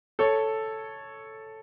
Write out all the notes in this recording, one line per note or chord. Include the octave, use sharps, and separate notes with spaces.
A4 C#5